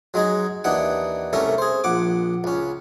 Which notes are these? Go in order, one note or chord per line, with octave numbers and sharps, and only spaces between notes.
F#3 G#3 D#4 G#4
D#2 E3 D4 D#4 F#5
C2 A3 C#4 A#4 E5
G#4 C5
A#1 F#5 D6
C#2 C#4